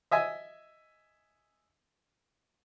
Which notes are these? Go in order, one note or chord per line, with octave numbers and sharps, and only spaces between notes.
D#5 E5 G#5